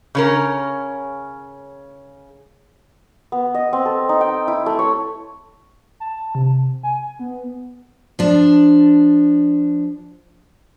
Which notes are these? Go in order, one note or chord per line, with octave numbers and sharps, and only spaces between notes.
C#3 C#4 A#4
B3
D#5
C4
A4
D#4
G5
E4
A3
C#5
A5
C3
G#5
B3
F3 D4